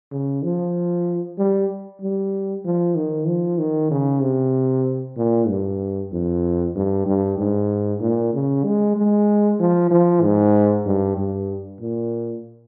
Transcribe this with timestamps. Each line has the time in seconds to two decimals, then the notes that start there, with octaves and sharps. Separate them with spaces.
0.12 C#3
0.43 F3
1.38 G3
2.01 G3
2.65 F3
2.95 D#3
3.27 F3
3.58 D#3
3.91 C#3
4.22 C3
5.17 A#2
5.49 G2
6.12 F2
6.76 G2
7.06 G2
7.38 G#2
8.01 A#2
8.34 C#3
8.64 G#3
8.97 G#3
9.60 F3
9.91 F3
10.22 G#2
10.86 G2
11.17 G2
11.81 A#2